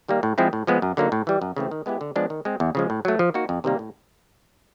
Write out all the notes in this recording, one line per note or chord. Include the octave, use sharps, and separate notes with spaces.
D#3 G3 A#3
A2
F3 G#3 C4 E4
A2
F3 G#3 B3
F#2
D3 F#3 A#3 D#4
A2
E3 G3
F#2
C#3 E3 A3 C4
D#3
G#3 B3 E4 G4
D3
F3 G#3 B3 D4
D#3
G#3 C4
E2
C#3 F3 G#3
A2
F#3 A3
F3
A#3 D#4 F#4
F2
C3 D#3 G3 A#3
A2